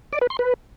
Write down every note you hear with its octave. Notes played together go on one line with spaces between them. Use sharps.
D5
B4
C6
B4